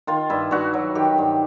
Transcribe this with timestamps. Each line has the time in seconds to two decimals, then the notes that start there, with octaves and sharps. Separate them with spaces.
0.07 D#3 F4
0.30 G2 E4
0.51 G2 F#4
0.74 F#3
0.95 D#3 G4
1.18 G2